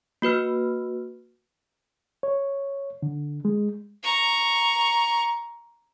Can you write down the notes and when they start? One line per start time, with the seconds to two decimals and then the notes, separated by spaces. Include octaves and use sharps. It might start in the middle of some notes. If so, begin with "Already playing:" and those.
0.22 A#3 F#4 B4 F6
2.23 C#5
3.02 D3
3.45 G#3
4.03 A#5 C#6